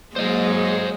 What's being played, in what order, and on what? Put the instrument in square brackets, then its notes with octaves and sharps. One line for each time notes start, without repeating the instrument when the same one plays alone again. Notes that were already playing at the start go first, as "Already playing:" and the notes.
[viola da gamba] F#3 G#3 A#3 [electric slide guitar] C5 D#5